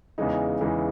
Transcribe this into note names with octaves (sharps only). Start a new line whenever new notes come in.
E2 C#3 E3 G#3 D#4
E2 C#3 E3 G#3 D#4